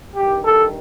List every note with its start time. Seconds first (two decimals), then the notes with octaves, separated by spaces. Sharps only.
0.16 G2 D#3 G4
0.46 A4